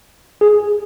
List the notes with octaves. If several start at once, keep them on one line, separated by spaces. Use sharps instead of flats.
G#4